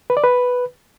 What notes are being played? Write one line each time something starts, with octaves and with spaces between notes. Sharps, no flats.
B4
D5
B4